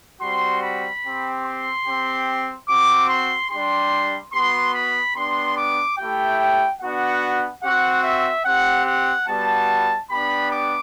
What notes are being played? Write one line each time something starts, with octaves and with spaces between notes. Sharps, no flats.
G3 C4 F#4 C6
B5
C4 G4
C6
C4 G4
C4 F#4 D6
C6
G3 D4 G4 C6
B3 F#4 C6
B5
B3 D4 G4 C6
D6
A3 E4 G4 G5
B3 D4 F#4 F#5
C4 F#4 F#5
E5
C4 G4 F#5
F#5
G3 B3 F#4 A5
B3 D4 G4 B5
D6